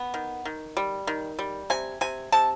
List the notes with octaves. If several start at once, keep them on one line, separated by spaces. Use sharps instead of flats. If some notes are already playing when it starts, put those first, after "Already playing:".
Already playing: B3
D#3
D#3
G3
D#3
G3
C3 G#5
C3 G#5
C3 A5